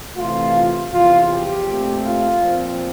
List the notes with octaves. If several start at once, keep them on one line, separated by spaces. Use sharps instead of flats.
C3 E3 A3 F4
E2 C3 F3 F4
G4
A#2 A3 C4
F4
A#2 F3 C4